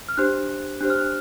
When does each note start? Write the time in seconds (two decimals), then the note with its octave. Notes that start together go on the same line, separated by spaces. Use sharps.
0.09 F6
0.17 D4 G4 C5 F#6
0.81 D4 G4 C5 F#6
0.90 F6
0.97 F#6